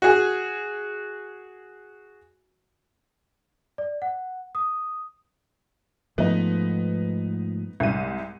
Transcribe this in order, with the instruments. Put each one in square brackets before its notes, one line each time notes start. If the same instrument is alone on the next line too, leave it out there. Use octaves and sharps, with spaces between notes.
[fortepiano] F#4 G#4
[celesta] D5
F#5
D#6
[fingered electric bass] G#2 F3 A3 [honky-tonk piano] B3 D#4
[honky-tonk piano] C2 G#2 D#7